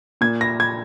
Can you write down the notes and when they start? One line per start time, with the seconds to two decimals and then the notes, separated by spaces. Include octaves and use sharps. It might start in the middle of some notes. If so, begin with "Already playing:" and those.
0.21 A#2 G#6
0.41 A#6
0.60 G#6